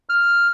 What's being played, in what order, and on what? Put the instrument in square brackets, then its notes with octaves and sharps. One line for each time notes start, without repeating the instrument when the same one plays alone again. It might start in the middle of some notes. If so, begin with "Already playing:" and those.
[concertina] F6